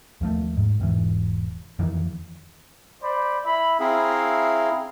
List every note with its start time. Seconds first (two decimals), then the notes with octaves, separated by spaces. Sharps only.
0.21 D#2 F3 A3
0.57 G#2
0.80 E1 G#2 E3
1.79 F2 D#3 E3
3.03 C5 D5 B5
3.44 E4 E5 B5
3.80 C4 E4 G#4 E5 F5 A#5